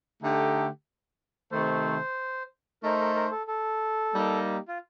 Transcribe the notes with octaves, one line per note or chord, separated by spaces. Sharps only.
D3 A3 D#4 G4
C3 D#3 A3 C5
A3 D#4 A4 A#4 C5
A#4
A#4
A4
A4
G3 A#3 D#4 G4
F4